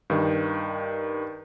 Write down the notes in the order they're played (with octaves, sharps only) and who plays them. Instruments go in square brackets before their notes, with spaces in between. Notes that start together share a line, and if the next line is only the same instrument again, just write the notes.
[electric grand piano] G2 D#3